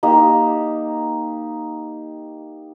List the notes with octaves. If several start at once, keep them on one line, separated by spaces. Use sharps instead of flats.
A#3 D#4 G4